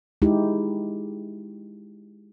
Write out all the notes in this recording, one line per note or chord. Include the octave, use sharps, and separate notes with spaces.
G#3 D#4 E4 G4